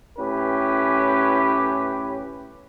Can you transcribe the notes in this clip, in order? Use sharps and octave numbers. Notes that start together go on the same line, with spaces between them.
A2 C#4 G4 B4